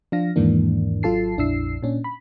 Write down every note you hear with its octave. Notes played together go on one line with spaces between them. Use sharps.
F3 D4 F4 F5 A#6
E2 G#2 D#3 E3 A#3 D4
G#1 F#3 F4 A4 A5 C7
A#1 F2 D4 E4 E6 C7
A#2 C#4 D4
B5